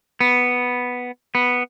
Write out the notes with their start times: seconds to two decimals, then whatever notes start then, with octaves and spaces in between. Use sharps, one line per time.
0.21 B3
1.35 B3